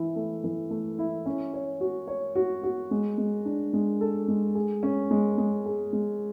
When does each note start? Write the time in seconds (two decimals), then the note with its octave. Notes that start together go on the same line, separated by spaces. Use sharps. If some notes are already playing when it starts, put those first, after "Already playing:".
Already playing: E3 E4
0.16 A3
0.44 E3
0.70 A3
0.98 E4
1.26 C#4
1.53 C#5
1.81 F#4
2.07 C#5
2.35 F#4
2.63 F#4
2.91 G#3
3.18 G#3
3.45 D4
3.73 G#3
4.01 A4
4.28 G#3
4.55 G#4
4.83 C#4
5.11 G#3
5.38 G#3
5.66 G#4
5.93 G#3